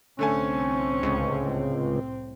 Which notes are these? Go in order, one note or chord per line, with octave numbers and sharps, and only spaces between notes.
C2 A2 D3 A3 C4 C#4 G#5
C#2